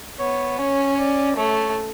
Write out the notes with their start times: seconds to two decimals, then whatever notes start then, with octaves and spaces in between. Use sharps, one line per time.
0.19 B3 C#5
0.58 C#4 C#5
0.98 D5
1.36 A3 C#5